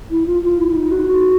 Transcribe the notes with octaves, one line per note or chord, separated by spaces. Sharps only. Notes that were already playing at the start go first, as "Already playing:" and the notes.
E4
F4
F4
E4
E4
D#4
F#4